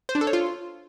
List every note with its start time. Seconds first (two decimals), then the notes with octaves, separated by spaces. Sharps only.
0.09 C5
0.15 D4
0.21 A4
0.27 C#5
0.33 F4